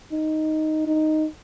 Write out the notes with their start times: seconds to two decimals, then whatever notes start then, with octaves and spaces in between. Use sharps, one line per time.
0.12 D#4
0.87 D#4